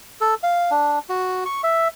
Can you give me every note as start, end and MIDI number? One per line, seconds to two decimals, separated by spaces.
0.21 0.34 69
0.43 0.70 77
0.71 0.99 62
1.09 1.44 66
1.46 1.62 85
1.63 1.88 76